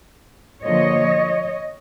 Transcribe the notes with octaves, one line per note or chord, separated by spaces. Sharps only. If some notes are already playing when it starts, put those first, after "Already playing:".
D3 F3 A#3 C#5 D#5